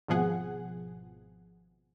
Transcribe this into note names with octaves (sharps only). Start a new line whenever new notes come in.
G#1 B2 F3 G#4 F#5